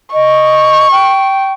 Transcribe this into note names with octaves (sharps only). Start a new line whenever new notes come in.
D#5 C#6
G5